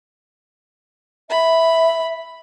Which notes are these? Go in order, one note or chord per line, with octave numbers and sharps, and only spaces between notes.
E5 B5